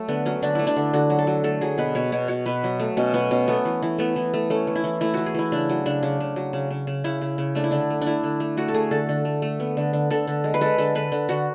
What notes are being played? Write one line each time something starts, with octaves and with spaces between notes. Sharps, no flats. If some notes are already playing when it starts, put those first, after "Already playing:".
Already playing: F#3 A3
D3 B3
F#3 C#4
D3 D4
A3 E4
D4
D3
D3 F#4
F#3
A4
F#3
A3 A4
F#3 G#4
B2 B4
B2 C#5
B2 C#5
B2 C#5
B2 B4
F#3
A3
B2 C#4
B2 B3
B2 C#4
A3 B3
E3
E3
A3 B3
E3
A3
A3 C#4
E3
E4
E3
A3 E4
E3 F#4
G#4
E3 E4
C#3 D4
F#3
C#3 D4
C#3
C#3
F#3
C#3
C#3
C#3
C#3 E4
C#3
C#3
A3 D4
E4
D3 D4
A3
D4
A3 E4
D3
A3
A3 F#4
A4
A3 G#4
D3 A4
D3
A3
A3
B3
D3
D3
D3 A4
D3
G#3
B4
G#3 A4
D3 A4
D3 B4
D3
D3 F#4